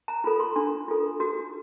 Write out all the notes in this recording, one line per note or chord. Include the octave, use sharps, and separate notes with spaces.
A#5
F4 A4 B5
C6
D4 C6
F4 A4
F#4